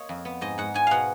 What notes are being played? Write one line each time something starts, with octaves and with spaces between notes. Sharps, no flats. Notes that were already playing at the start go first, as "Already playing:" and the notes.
Already playing: A#3 C#5 D#5
F2
B3
G#2 D#5
G#2 F#5
G#2 G#5
B2 F5 F#5